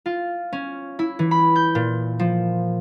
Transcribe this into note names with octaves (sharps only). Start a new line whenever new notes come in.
F4
C#4
E4
E3
B5
G6
A#2
F3